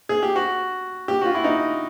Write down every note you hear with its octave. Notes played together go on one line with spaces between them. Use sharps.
G#4
G4
F#4
G4
F#4
F4
E4
D#4